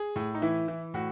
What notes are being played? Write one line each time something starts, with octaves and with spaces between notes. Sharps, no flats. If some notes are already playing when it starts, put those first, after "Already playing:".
Already playing: G#4
A2
D#4
E3 E4
E3
A2 F#4